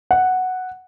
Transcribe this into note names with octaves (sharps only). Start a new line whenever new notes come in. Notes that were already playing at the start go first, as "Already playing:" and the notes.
F#5